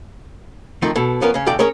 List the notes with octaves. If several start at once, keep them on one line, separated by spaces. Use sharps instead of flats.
D#3 F3 A3 C4 D#4
B2 A4
F3 B3 C#4 A#4
C#3 C#4
E2 C#3 A4 D5 G5
C#4 G#4 A#4 C#5